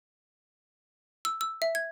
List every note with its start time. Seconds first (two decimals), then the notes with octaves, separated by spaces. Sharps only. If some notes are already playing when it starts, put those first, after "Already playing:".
1.25 E6
1.41 E6
1.62 E5
1.75 G#6